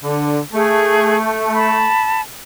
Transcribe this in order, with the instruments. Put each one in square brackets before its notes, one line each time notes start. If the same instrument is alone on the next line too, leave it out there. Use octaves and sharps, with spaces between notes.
[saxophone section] D3
[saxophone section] A3 [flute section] G#4
[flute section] A5 B5